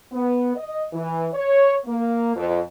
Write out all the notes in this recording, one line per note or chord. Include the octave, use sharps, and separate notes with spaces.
B3
D#5
E3
C#5
A#3
F2